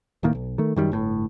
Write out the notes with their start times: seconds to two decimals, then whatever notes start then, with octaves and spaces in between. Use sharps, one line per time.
0.23 D1 A2 D#3 A#3
0.35 B1
0.58 D#3 A3
0.76 F#2 D#3 G3
0.92 G1 A2